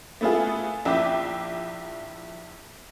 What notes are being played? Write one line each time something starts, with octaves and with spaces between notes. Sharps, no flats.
A3 B3 E4 F4 G#4
A#1 E4 E5 G5 D6 B6